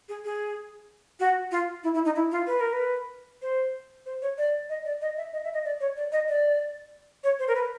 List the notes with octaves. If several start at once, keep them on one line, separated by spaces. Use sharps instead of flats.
G#4
G#4
F#4
F4
E4
E4
D#4
E4
F4
B4
A#4
B4
C5
C5
C#5
D5
D#5
D5
D#5
E5
D#5
E5
D#5
D5
C#5
D5
D#5
D5
C#5
C5
A#4
B4